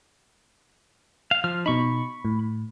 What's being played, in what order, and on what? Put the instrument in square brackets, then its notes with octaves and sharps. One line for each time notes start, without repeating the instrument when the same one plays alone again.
[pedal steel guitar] F5
F3 F6
[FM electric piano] B2 D#4 [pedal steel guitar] B5 C#6
[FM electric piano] A2